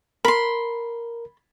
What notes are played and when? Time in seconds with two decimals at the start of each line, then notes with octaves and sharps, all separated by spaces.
0.25 A#4 B5 C6